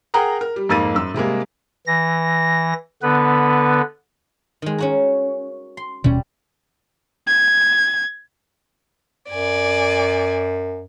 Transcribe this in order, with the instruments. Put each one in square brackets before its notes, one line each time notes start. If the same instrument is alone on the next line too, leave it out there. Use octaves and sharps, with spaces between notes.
[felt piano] G#4 A#4 F#5 G5 A#5 D#6
A#4
G3
F2 G#2 A#3 E6 A6 D#7
F#2 E6
C3 G3 G#3 A#3
[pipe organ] E3 A#6
D3 B3 B4
[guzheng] D#3 G#3
C#4 F#4 A#4
C6
[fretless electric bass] D#1 B2 C#4 [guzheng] G3
[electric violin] G#6
[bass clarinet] F#2 [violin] D5 G#5